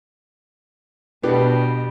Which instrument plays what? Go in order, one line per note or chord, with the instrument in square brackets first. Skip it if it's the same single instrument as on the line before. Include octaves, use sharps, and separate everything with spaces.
[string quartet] B2 G3 [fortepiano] B3 D4 G4